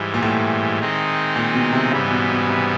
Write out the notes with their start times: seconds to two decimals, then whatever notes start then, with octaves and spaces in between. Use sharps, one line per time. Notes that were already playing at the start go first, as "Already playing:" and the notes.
Already playing: G#2 E3 G3
0.14 A#2
0.23 A2
0.79 D#3 G#3 C4 D#4
1.36 A#2
1.55 B2
1.73 C3
1.92 G#2 C#3 E3 G3 B3
2.11 B2
2.30 B2
2.48 C3